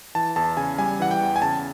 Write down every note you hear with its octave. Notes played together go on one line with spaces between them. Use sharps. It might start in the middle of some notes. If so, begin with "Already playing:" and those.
E3 A5
E2 A5
C#3 G#5
G3 G#5
E3 F#5
G5
E2
G#5
C#3 A5